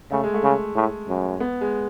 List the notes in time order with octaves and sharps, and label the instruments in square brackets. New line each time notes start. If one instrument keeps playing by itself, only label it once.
[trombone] C#3 [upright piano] A3
[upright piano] G#3
A3
[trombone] C#3
A2
F#2
[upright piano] B3
G#3